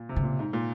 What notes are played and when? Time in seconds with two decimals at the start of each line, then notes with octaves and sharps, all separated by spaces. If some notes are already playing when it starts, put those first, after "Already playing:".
Already playing: A#2
0.09 C3
0.16 C#3
0.23 A#2
0.39 G#2
0.53 A#2